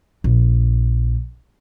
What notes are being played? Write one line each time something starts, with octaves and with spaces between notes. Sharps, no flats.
A#1